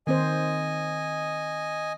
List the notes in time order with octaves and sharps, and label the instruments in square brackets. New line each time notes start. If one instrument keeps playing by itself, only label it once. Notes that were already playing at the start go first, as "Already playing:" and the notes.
[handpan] D#3 C4 C5 [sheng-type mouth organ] D#5 G#5